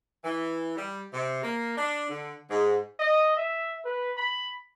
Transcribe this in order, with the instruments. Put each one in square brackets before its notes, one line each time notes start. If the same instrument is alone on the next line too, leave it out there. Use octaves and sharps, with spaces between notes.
[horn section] E3
G3
C3
A#3
D4
D3
G#2
[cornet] D#5
E5
B4
B5